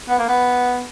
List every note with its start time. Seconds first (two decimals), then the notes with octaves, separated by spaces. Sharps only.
0.08 B3
0.18 A#3
0.28 B3